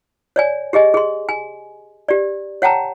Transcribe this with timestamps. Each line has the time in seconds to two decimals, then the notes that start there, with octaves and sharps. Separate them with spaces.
0.36 C#5 D5 G#5
0.73 G4 G#4 D#5 G#5
0.94 G#4 C6
1.29 G#5
2.08 G4 D5
2.62 C#5 F#5 G5 A5 A#5